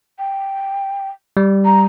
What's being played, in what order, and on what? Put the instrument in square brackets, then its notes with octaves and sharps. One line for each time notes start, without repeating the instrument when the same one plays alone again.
[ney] G5
[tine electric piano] G3
[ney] A#5